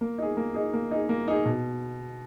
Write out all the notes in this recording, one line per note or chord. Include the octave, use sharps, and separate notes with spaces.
A#3
D#4 G#4
A#3
D#4 G#4
A#3
D#4 G#4
A#3
D#4 G#4
B2